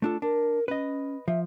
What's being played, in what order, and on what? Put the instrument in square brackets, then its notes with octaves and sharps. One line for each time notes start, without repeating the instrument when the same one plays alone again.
[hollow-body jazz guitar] A3 D4 A4 [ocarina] F4
[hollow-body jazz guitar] D4 [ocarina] A#4
[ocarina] C#4 [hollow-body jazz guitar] B4 D#5
[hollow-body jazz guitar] F3 [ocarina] E5